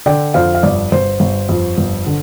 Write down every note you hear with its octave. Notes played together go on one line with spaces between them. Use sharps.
D3 D5 G5
F2 C5 F5
F5
G1 D5
G1 C5
G1
F2
G1
D3